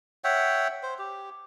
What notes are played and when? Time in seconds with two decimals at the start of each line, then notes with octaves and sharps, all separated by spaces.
0.24 C#5 E5 F#5 G5
0.83 C5
0.99 G4